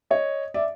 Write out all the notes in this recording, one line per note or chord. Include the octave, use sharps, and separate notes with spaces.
C#5 D#5
D5 E5